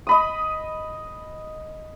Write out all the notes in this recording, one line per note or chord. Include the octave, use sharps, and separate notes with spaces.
D#5 B5 D#6